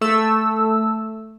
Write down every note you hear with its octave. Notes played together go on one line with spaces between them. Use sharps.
A3 E6